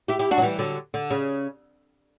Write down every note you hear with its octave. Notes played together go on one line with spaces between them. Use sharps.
E4 G4
E4 G4
D4 F#4
F#3
E3 G3
D3 F#3
D3
C#3